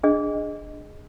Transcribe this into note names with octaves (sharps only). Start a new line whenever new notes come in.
D4 G#4 D#5